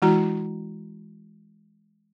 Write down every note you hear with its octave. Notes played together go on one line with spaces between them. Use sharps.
E3 G#3 E4 F#4 A#5